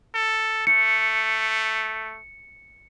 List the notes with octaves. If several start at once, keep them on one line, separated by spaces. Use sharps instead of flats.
A4
A3 C#7